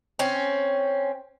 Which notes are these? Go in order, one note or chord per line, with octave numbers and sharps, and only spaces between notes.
C4 C#4